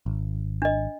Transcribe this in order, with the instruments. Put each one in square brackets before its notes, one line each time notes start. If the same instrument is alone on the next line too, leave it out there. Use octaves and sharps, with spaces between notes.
[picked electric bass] G#1
[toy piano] D4 D#5